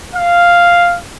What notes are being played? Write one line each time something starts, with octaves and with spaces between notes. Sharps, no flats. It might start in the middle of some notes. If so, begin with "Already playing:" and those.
F5